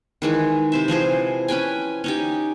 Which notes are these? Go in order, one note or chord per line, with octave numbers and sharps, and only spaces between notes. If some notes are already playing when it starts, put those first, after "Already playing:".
D#3 E3 G#3
C3 C5 E5
E3 F3 G#4 C5
C#4 B4 G5 G#5
C#4 D#4 G4